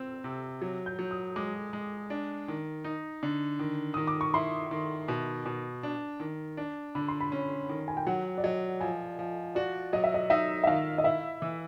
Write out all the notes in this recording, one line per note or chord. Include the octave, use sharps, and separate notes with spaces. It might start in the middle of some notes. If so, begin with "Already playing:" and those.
Already playing: C4 E6
C3
F#3
G6
F#3
D#6
G#3 D6
G#3
D4
D#3
D#4
D3
D#3
D#3 D#6
D6
C#6
E4 C6
D#3
B2
B2
D4
D#3
D4
D3 B5
C6
B5
C#4
D#3
G#5
G5
F#3 F#5
D5
F#3 D#5
F3 G#5
F3
F#4 D5
F#3 D#5
E5
D#5
D#4 E5
E5
D#3 F5
D#5
E4 E5
E3